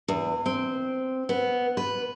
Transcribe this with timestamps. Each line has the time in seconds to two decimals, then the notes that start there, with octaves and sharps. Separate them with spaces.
0.08 E2
0.46 C4
1.29 B3
1.77 B4